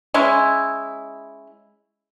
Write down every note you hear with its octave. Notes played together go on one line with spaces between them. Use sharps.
G#3 C#4 E4